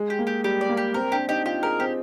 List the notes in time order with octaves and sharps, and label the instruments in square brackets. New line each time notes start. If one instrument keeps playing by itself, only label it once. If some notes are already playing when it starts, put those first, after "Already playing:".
Already playing: [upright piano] G#3
[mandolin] G4
[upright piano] A#3
[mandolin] G4
[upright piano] G3 [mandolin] G4
[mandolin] D5
[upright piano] A#3
[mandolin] G4
[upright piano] C4 [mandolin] A#4
[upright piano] D4 [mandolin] G4
[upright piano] D#4 [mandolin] G4
[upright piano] F4 [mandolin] G4
[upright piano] G#4 [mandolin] A#4
[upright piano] C4 [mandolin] G4